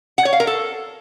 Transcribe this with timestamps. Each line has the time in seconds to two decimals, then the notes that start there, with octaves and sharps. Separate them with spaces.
0.18 F#5
0.25 C#5
0.33 F5
0.40 A#4
0.47 A4